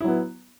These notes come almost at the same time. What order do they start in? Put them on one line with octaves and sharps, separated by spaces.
E4 F#3 B3